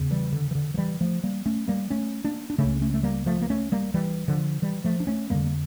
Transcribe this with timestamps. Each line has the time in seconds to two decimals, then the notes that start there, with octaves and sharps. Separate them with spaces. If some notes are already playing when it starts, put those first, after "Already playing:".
Already playing: E2 C#3
0.11 E3 G3
0.32 D3
0.51 E3
0.55 D3
0.74 F3
0.78 E3 G3
1.01 F3 A3
1.24 G3 A#3
1.46 A3 C#4
1.68 G3 A#3
1.90 A3 C#4
2.25 A#3 D4
2.50 D4
2.58 C#2 C#3 A3 C#4
2.82 A3 C#4
2.94 A3
3.03 G3 A#3
3.26 F3 A3
3.42 A#3
3.50 A3 C#4
3.72 G3 A#3
3.94 E3 G3
4.28 D3 F3
4.62 E3 G3
4.84 F3 A3
5.00 D4
5.07 A3 C#4
5.30 F2 D3 G3 A#3
5.46 A#3